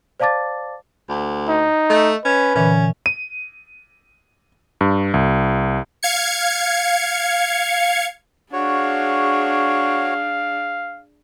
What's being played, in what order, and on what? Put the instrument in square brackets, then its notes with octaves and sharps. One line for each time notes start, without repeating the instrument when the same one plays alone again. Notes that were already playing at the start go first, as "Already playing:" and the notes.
[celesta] C5 D5 F5 A5 D6 A6
[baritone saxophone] D2
[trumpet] D#4
[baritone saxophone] A3 [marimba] D#5
[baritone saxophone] C#4 [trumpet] B4
[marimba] A#2 D3 E3 [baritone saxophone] C#4
[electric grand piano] D#7
G2
C2
[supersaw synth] F5 G#6 C#7
[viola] D4 G#4 [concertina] F#4 C#5 [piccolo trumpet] F5